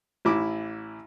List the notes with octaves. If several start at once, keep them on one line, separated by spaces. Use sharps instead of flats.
A1 E4 D6